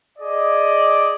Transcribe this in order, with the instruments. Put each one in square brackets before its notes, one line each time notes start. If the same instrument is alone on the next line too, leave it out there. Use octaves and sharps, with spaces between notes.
[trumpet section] G#4 D5 D#5